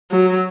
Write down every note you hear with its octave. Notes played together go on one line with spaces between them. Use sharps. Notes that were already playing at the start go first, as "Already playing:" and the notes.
F#3